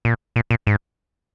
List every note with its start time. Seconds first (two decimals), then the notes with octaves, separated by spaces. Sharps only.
0.05 A#2
0.36 A#2
0.51 A#2
0.67 G#2